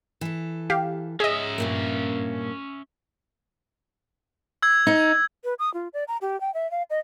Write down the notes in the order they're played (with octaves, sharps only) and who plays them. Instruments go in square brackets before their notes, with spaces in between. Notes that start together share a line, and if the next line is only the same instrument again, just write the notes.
[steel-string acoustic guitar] E3 A4
[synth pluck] G4 F5
[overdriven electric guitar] C#4 E5 [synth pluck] G#4 D#5
[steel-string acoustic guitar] G2 A#2 A#3
[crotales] E6 G#6
[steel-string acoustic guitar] D#4
[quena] B4
D#6
F4
D5
A#5
G4
G5
E5
F5
D#5